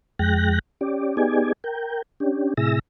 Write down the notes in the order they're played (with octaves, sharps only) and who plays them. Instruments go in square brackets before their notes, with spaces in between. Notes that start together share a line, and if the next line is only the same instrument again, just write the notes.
[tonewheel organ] F2 G#3 G5 F#6 A#6
C#4 G4 D5
B3 D#4 G4 G#4 D5 G#5
A#4 G5
C#4 D4 G4
A2 C3 E4 G#4 E6 A#6